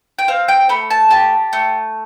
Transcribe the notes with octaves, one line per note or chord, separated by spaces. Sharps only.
G5
C4 F5
G5
A3 B5
A5
G4 A5
A3